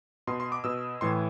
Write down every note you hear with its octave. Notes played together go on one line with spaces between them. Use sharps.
B2 C6
C6
D6
B2 E6
A2 E3 C6